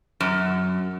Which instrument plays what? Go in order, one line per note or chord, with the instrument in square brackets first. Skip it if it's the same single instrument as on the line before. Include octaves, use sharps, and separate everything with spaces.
[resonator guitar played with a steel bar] F#2